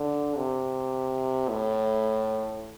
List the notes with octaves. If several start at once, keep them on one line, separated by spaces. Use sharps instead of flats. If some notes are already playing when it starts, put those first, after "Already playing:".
Already playing: D3
C3
A2